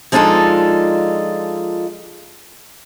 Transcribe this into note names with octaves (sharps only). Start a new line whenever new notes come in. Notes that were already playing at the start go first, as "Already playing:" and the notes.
F3 G#3 D4 D#4 F4 A4